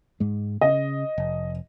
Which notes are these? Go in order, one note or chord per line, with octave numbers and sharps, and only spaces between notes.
G#2 G#3
C#3 D#5
F1